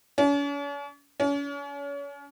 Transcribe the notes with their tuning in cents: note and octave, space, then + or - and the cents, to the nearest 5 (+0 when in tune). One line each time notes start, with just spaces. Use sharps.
C#4 +45
C#4 +35